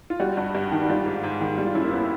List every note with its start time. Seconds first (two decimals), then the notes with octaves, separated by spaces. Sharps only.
0.10 F4
0.20 G3 F#4
0.37 G2
0.55 G2
0.72 D#3
0.83 F#4
0.89 G3 F4
1.06 G#2
1.23 G#2
1.41 D#3
1.58 G3
1.66 F4
1.75 F#2 E4
1.84 A#3
1.92 B3